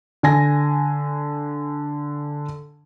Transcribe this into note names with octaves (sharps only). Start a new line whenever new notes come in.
D3 G#5 A#6